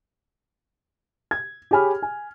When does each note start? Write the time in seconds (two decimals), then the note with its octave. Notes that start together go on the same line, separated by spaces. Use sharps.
1.31 G#6
1.71 G4 G#4 C#5 G#5 B5 F6
2.03 G#5